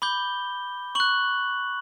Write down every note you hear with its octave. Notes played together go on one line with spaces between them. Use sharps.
B5 D6 G6 G7
C#6 F#6 F#7